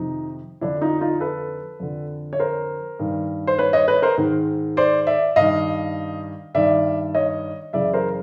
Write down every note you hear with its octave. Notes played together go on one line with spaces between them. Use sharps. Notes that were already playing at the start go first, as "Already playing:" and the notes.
Already playing: F2 C3 D#3 D#4
F2 D3 D4 E4
D#4 F4
D#4 F4
A4 B4
F2 D3
C#5
A#4 C5
G2 D#3
C5
B4 C#5
C#5 D#5
B4 C#5
A#4 C5
G#2 D#3
C5 D5
D5 E5
G2 D#3 D#5 F5
G2 D#3 D5 E5
C#5 D#5
F#2 C#3 E3 D5 E5
A#4 C5